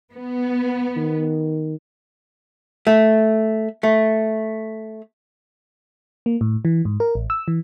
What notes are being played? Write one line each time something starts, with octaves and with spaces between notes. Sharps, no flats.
B3
D#3
A3
A3
A#3
A2
E3
G#2
A#4
A1
E6
E3